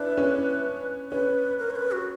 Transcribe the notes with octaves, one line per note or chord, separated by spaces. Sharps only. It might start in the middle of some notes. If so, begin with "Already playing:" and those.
Already playing: D4 E4 B4
C#4
C#4 B4
A#4
C#5
B4
F#4